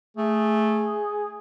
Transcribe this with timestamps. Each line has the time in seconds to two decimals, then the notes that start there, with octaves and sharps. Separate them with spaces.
0.17 A3 G#4